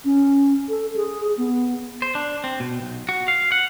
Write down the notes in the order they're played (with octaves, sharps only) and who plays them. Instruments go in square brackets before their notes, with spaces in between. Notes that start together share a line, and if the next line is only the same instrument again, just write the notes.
[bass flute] C#4
A4
G#4
B3
[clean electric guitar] C5
D4
C4
B2
B1
F#4
F5
F#5